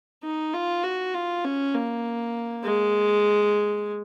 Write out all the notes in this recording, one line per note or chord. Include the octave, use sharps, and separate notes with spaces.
D#4
F4
F#4
F4
C#4
A#3
G#3